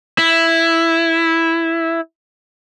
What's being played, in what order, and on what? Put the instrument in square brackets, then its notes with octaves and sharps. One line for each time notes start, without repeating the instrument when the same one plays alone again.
[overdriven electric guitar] E4